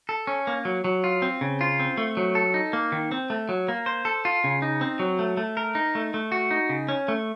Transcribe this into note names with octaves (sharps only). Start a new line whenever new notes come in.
A4
C#4
A#3
F#3
F#3
F4
C4
C#3
F4
C4
A3
F#3
A4
D#4
A#3
D#3
C4
A3
F#3
A#3
C5
A4
F4
C#3
D#4
C4
F#3
A3
A3
A#4
D#4
A3
A3
F#4
D#4
C#3
C#4
A3